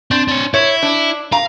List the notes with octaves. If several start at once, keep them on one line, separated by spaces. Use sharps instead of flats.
C4 D4
D4 C#5
E4 C#5
D4
F5 A#5